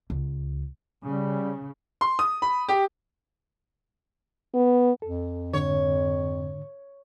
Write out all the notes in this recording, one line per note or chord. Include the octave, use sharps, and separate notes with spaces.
C#2
C#3 G3
C6
D#6
B5
G4
B3
F2 A4
G#2 D3 C#5